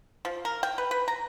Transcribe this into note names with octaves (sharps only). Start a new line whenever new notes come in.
F3
A#4
G5
B4
B4
A#5